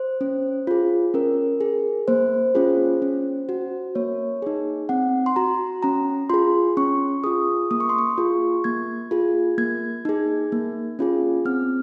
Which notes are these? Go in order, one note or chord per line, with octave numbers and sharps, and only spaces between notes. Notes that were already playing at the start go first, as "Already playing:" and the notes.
Already playing: C5
C#4
F4 G#4
C#4 A#4
G#4
A#3 C5
C#4 F4 G#4
C#4
F#4
A#3 C#5
D#4 G#4
C4 F#5
C6
F#4 A#5
C#4 A#5
F4 G#4 C6
C#4 C#6
F4 G#4 D#6
A#3 D#6
C#6
C6
C#6
F4 G#4
A#3 G#6
F4 G#4
A#3 G#6
D#4 G#4
A#3
C#4 F4 G#4
C4 F6